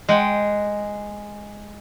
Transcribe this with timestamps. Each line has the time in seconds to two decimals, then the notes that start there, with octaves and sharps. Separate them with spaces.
0.09 G#3 F#5 G5